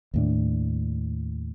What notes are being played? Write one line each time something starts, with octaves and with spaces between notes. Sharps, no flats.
D#2 A2 D4